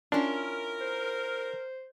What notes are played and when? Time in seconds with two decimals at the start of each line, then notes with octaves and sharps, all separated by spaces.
0.12 C#4 D4 E4 F4 A#4
0.81 C5